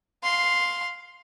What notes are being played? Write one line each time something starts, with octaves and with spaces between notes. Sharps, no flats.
F5 C6